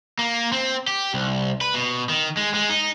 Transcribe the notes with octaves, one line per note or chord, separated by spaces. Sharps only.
A#3
C4
G4
C2
B4
B2
D#3
G#3
G#3
D#4